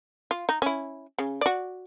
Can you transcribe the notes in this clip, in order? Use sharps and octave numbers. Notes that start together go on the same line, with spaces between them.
F4
D#4
C#4 E4
C#3
F#4 D5